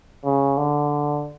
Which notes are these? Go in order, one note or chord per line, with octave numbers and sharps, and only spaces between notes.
C#3
D3